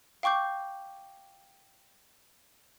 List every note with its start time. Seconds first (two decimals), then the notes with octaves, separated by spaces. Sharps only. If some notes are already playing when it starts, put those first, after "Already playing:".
0.23 F5 G5 C#6 D6 G6